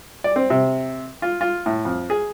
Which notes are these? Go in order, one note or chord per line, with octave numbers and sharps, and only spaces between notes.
D5
C4
C3
F4
F4
A2
F2
G#4